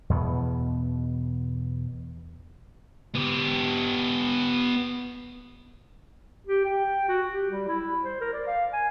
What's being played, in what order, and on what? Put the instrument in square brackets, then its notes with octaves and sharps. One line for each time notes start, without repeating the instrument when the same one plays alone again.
[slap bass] E2 B2 B3
[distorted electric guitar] B3 G4
[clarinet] G4
G5
F#4
G4
G3
E4
C5
A#4
D5
F5
G#5